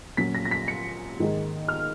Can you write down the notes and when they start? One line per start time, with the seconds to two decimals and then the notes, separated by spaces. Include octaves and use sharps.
0.17 A#2 F#3 C#4 F4 B6
0.35 A#6
0.45 A#6
0.51 B6
0.68 C#7
1.19 G#2 D#3 G#3 D#4
1.68 F6